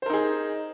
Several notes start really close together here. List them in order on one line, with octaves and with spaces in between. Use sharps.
C5 A#4 D#4 G#4